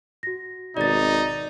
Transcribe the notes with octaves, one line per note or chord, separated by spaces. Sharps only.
F#4 A#6
G#1 B2 D#4 D5 A6